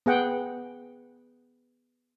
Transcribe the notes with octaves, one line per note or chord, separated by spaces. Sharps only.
B3 G#4 F#5 G5